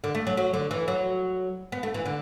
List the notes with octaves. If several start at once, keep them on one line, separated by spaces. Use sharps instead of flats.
D3
A3
F#3
F#3
D3
E3
F#3
B3
A3
E3
D3